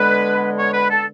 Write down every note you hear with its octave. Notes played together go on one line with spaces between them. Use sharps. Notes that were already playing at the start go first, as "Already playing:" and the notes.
Already playing: D3 G#3 B3 B4
C#5
B4
A4